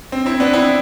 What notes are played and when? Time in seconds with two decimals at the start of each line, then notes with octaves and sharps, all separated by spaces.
0.12 C4
0.26 C4 E4
0.40 B3 D4
0.53 C4 E4